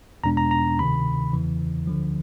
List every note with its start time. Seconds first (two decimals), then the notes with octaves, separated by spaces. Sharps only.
0.24 E2 B2 G#3 B3 D4 A#5
0.37 A#5
0.51 A#5
0.79 D2 C3 D#3 B5
1.33 E2 C#3 E3
1.87 D2 D3 F3